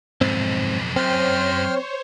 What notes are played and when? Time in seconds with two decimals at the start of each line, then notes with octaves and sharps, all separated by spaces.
0.21 B1 F2 G#2 C4
0.96 F#2 C4 C5 C#5 G5 C6 F6